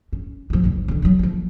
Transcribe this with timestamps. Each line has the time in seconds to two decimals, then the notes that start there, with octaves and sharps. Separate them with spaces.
0.13 C#4
0.50 F3 B3
0.64 G1 C#2
0.88 D3 E3
1.02 F3 F#3
1.19 F3 A#3